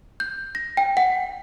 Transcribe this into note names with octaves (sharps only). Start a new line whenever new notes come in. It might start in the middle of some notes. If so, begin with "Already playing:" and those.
G6
A#6
G5
F#5